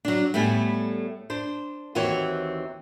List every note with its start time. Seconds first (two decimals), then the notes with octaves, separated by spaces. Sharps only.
0.05 F#3 D4
0.34 A2 G3 A3 B3 G#5
1.30 D4 C5
1.95 D#2 E3 C4 F#4 C#5